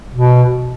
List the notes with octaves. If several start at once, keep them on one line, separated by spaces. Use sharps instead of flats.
B2